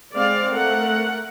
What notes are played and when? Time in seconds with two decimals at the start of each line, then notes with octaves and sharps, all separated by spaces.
0.15 G#3 C4 D5 F5
0.53 A3 A#4 F#5